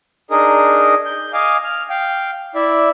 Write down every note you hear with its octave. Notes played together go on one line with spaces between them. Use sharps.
D4 D#4 G#4 A#4 D#5
G6
D#5 F5 G#5 D6
F6
F5 G5
E4 D5 E5